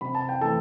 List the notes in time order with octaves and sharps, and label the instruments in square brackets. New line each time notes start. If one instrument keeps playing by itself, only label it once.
[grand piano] C3 B5
A5
G5
E3 A3 A4 A5